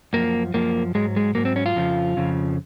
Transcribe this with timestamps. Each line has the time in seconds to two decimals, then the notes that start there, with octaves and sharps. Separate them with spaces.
0.13 F#2 F3 A#3
0.54 F#2 F3 A#3
0.95 G#2 F#3 G#3
1.16 G#3
1.35 G#2 F#3 A#3
1.45 C4
1.56 C#4
1.66 F4
1.76 F2 C#3 F3
2.17 F2 C#3 F3